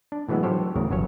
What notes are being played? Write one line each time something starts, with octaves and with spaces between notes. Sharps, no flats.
D4
A2 D3 E3 F#3 G#3 B3
F3 F#3 G4 A4 C5 C#5
E2 A2 C#3 A#4
G1 F#3 C#4 C#5